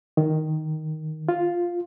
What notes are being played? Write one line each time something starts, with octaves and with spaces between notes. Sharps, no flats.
D#3
F4